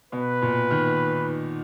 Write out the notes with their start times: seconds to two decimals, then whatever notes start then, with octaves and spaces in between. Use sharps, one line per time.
0.12 B2 B4
0.42 A#2
0.71 D#3